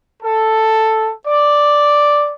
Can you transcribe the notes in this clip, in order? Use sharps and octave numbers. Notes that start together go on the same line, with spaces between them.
A4
D5